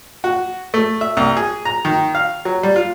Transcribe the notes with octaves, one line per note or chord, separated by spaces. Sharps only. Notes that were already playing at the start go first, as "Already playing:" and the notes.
F#4
A3
E5
C2
G#4
A#5
D#3
F5
F#3
G3
F4